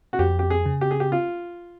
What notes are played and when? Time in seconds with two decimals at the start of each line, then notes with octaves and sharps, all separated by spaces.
0.13 F#4
0.19 F2 G4
0.39 G4
0.50 G#4
0.66 C#3
0.81 G4
0.91 G#4
1.00 G4
1.12 F4